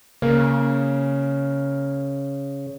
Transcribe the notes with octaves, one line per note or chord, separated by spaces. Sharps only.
C#3 A#3